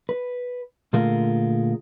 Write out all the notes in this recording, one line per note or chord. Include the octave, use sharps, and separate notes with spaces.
B4
A#2 D3 A3 F4 G#4 A#4